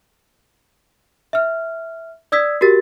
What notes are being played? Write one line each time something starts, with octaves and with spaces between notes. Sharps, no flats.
E5 F6
D5 D#6 E6 G#6 B6
F#4 G4 A#4 A6